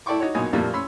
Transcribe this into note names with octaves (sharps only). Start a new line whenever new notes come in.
E4 A4 D5 G5 C#6 D6
D#4 F#4 C#5
A#1 B2 F#3 D#4 G#5 D#6
F2 A#2 F3 G3 A3 A#3
C#4 B5 C6 E6